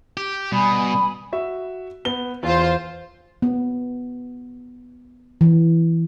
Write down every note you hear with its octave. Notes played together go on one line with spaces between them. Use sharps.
G4
B2 G3 G#5 B5 D#6
F#4 E5
B3 G7
E2 F4 C5
B3
E3